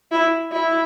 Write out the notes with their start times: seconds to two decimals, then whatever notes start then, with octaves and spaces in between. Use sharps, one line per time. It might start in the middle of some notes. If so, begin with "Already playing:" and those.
0.12 E4
0.52 E4